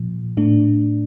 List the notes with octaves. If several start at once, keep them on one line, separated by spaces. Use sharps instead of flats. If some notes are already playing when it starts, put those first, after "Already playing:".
Already playing: A#2 F3
A2 A3 D4